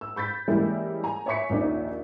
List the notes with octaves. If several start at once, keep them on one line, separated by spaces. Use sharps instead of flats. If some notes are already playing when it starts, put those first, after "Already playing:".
E6
B5 G6 A6 B6
E3 G3 G#3 A#3 C#4 E4
G#5 A#5
C#5 E5 G#5 C#6 B6 C#7
A#1 D#2 C#4 D#4 D5